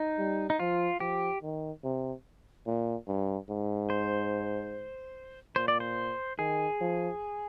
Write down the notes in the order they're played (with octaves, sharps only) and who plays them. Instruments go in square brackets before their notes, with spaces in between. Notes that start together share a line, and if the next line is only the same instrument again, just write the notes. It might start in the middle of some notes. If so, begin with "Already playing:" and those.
Already playing: [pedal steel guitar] D#4
[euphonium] G3
[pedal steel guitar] D#4
[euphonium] F3 [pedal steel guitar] F4
[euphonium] F3 [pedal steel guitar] G4
[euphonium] D#3
C3
A#2
G2
G#2
[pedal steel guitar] C5
[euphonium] A#2 [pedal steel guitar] C5
[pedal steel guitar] D5
C5
[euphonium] D#3 [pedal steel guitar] G#4
[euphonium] F3